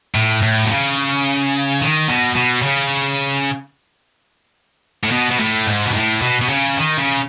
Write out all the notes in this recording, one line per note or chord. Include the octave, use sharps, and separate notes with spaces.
A2
A2
B2
C#3
D#3
B2
B2
C#3
A2
B2
B2
A2
G#2
B2
A2
B2
B2
C#3
D#3
C#3